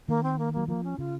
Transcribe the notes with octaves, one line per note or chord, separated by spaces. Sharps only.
D#3 A#3
C4
A#3
F#3 A#3
F3 A#3
C#4
C#3 F4